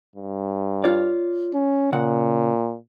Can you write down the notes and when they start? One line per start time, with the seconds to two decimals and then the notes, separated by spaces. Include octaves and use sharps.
0.16 G2
0.84 F4 C#5 D5
1.54 C#4
1.93 A#2 C#3 F#5